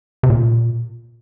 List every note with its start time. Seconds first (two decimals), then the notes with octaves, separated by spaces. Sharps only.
0.23 C3
0.30 A#2